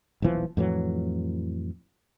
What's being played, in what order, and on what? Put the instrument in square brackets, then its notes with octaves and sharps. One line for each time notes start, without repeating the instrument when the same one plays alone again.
[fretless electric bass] D#1 B1 E3 F3
F2 A2 E3 F#3